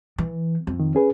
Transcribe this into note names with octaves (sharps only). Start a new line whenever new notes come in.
E3
F2
D#3
C#4 G#4 B4